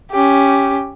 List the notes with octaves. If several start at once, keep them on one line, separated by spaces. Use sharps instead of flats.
C#4 G4